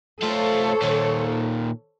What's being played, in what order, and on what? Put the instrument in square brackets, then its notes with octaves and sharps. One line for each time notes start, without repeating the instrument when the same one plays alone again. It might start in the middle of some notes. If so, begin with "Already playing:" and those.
[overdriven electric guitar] A3 F4 [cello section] A4 C5 C#5
[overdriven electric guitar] A#2 D#3